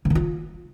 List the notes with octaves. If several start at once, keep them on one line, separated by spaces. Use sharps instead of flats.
E3
D#3
F4